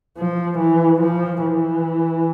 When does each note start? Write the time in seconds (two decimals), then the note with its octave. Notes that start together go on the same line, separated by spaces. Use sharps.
0.17 F3
0.59 E3
1.02 F3
1.43 E3